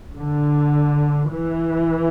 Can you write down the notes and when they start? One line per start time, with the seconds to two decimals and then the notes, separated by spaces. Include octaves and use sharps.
0.16 D3
1.30 E3